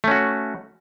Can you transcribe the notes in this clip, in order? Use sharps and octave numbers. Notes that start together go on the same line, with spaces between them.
A3 C#4 F#4